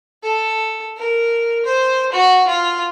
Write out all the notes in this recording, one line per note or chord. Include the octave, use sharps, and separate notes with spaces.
A4
A#4
C5
F#4
F4